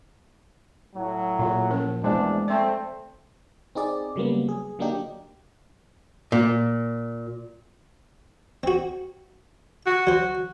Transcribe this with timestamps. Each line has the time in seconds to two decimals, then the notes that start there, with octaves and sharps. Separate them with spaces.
0.95 A2 F#3
1.39 A#2 F4 G#4
1.70 F3 C#4 A#4
2.04 E2 A#2 G#3 A3 D4 C5
2.48 A3 C4 D5 E5 C#6
3.75 C4 D#4 G#4 D5
4.16 C#3 F#3 G3 A#3 B3
4.49 G#4
4.79 D3 F#3 A#3 D4 D#4 G4
6.32 A#2
8.63 C4 F#4
9.86 F#4
10.07 F#3 C5